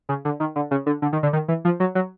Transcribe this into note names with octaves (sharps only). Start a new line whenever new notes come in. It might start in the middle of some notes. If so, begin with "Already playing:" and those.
C#3
D3
D#3
D3
C#3
D3
D3
D#3
D3
D#3
E3
F3
F#3
F#3